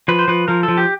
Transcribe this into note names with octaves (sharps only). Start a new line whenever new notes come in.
F3 B4
C5
F3 B4
F3 A#4
A4
F3
G4